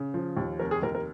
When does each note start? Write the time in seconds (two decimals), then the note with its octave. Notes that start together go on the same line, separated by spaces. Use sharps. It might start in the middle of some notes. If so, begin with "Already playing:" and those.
Already playing: C#3
0.14 F3
0.37 D#2
0.59 F1 A#4
0.71 G#4
0.82 D#2 A#4
0.95 A#4